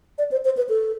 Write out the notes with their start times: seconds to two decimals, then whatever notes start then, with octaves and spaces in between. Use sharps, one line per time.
0.18 D5
0.32 C5
0.45 C5
0.57 B4
0.69 A4